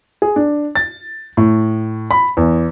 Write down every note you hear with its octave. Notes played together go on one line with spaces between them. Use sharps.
G#4
D4
A6
A2
B5
E2